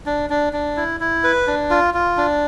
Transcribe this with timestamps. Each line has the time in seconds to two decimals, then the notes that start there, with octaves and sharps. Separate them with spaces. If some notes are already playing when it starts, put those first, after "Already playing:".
0.06 D4
0.30 D4
0.53 D4
0.77 E4
1.00 E4
1.24 B4
1.47 D4
1.70 F4
1.94 F4
2.17 D4